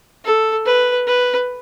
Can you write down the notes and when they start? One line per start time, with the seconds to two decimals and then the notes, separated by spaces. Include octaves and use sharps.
0.25 A4
0.66 B4
1.07 B4